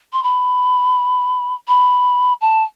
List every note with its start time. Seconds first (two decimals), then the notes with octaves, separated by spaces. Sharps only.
0.13 C6
0.23 B5
1.68 B5
2.41 A5